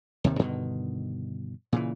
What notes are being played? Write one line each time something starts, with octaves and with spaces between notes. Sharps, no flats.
D#2 C3 D#3
G2 B2 D3 D#3
A#2 C#3 E3